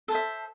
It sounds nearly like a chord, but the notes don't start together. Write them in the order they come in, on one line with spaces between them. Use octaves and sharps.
A4 C5 E5